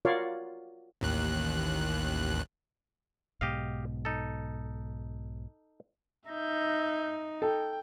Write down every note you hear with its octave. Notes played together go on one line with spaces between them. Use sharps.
F4 F#4 A#4 C#5 D5 F5
A1 D#2 F#6
B1 G#2 B2 G4 D#5 F5
D#4 A4
D#4 E5 G6
A4 G5